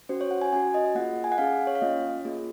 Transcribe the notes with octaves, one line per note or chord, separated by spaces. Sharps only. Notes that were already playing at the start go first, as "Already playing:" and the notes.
C#4 F#4 C5
C#5
F#5
G#5
C#4 F#4 G#5
D#5
D#5
A#3 F4 G#4 F#5
G#5
F#5
C#4 G#4 F5
C#5
F5
A#3 C#4 F4 D#5
A#3 F4 G#4